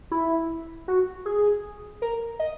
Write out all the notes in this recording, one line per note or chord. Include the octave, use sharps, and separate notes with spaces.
E4
F#4
G#4
A#4
D#5